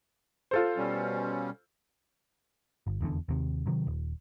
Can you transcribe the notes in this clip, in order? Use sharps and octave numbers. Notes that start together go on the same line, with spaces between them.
F4 A4 C5
B2 G3 C#4
G1
F1 E2 G2 D3
D#2 C3
C3 D#3 F#3
D#1